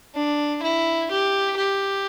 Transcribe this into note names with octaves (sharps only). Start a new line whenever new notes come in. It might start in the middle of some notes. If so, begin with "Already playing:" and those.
D4
E4
G4
G4